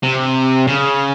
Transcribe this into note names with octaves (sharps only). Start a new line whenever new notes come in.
C3
C#3